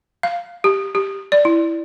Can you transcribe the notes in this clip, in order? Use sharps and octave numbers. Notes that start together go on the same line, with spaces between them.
F5
G4
G4
D5
E4